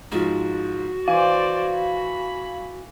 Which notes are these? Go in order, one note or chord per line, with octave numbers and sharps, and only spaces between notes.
G#2 F3 F#4
E3 C5 D5 F5 G#5
B5